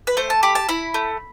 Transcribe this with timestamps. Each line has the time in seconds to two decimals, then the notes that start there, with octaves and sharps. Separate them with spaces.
0.07 B4
0.17 A3 C5
0.30 A5
0.43 G4 B5
0.55 A5
0.69 E4 B5
0.94 A3